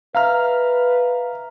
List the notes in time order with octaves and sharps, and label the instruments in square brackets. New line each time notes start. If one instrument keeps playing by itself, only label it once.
[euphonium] B4 [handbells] E5 A#5 [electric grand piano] F5 F6